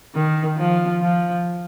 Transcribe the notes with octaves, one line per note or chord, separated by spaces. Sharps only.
D#3
F3
F3